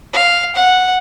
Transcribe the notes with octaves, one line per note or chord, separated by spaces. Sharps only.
F5
F#5